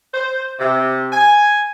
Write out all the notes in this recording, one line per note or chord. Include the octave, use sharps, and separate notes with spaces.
C5
C3
G#5